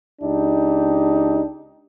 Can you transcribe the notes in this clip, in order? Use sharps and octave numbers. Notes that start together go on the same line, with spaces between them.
C#2 D4 D#4 G4